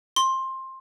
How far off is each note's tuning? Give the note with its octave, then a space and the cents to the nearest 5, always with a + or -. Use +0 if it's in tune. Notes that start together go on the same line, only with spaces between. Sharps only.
C6 +15